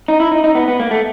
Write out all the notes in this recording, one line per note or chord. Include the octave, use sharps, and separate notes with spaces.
D#4
E4
D#4
D#4
B3
B3
A#3
A3